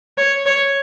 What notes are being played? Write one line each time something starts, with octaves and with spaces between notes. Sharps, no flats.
C#5
C#5